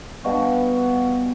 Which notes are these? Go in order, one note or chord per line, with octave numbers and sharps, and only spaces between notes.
B2 G3 F#4 F5